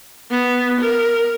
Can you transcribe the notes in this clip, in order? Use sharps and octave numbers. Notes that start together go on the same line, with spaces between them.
B3
A#4